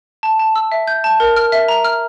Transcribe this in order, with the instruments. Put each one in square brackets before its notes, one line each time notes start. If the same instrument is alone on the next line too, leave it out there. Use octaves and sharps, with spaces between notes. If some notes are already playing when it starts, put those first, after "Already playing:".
[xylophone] A5
A5
E6
E5
G6
A5
A#4
F6
E5
A#5
F6